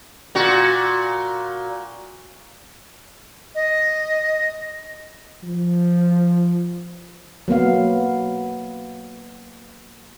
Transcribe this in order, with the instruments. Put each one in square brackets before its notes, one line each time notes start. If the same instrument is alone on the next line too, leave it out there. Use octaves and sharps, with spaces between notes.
[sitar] A#2 F#4
[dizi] D#5
[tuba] F3
[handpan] F#3 A#3 B3 F5